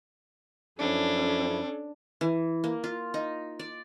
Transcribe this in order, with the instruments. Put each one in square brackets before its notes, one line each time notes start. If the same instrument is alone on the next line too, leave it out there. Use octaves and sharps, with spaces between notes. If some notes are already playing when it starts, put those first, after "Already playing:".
[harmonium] F#2 F3 E4 [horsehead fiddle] C#4 A4 [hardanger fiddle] D4
[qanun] E3
A#3
F4
D#4
D5